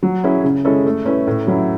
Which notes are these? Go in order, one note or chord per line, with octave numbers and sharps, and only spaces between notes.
F#3
C#4 E4 G#4
C#3
G#3 C#4 E4 A4
A3
C#4 E4 B4
A2
F#3 C#4 E4